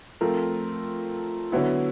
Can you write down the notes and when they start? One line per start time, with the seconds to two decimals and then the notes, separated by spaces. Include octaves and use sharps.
0.21 F3 A3 C4 F4 A#4
1.52 D3 F#3 B3 E4